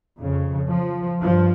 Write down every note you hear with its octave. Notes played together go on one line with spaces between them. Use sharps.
F2 C#3
F3
G2 F3